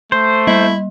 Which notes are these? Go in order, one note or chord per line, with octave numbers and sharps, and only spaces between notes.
A3 C5
G3 E4